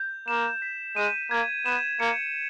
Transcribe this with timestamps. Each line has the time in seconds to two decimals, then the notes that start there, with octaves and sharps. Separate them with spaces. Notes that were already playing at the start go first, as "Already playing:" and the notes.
Already playing: G6
0.28 A#3 E7
0.62 B6
0.96 G#3 D#7
1.31 A#3 G#6
1.66 B3 E7
2.00 A#3 C#7